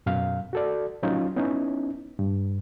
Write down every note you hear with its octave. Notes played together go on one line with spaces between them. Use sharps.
F#2 B2 F5
F#4 A4 D5
F3 F#3 C#4 D#4 F4
B3 C#4 D#4 E4
G2